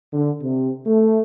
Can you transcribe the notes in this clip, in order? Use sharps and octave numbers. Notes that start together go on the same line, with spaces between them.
D3
C3
A3